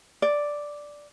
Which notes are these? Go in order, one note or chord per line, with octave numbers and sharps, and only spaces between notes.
D5